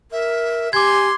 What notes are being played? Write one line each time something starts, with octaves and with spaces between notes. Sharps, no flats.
A#4 E5
G4 G#5 C6 D6 G#6